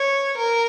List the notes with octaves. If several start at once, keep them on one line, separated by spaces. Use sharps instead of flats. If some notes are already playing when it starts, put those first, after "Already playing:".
Already playing: C#5
A#4